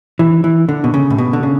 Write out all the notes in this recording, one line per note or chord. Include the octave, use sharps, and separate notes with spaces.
E3
E3
D3
B2
C#3
A2
B2
D3
C#3